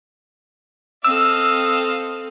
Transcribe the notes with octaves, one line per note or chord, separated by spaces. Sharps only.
C4 A4 D#5 F5 E6